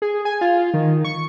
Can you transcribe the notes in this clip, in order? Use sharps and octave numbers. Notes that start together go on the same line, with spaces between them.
G#4
G#5
F4
D#3
C#6